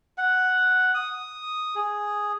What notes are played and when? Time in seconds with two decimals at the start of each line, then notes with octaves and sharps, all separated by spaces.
0.18 F#5
0.94 D#6
1.75 G#4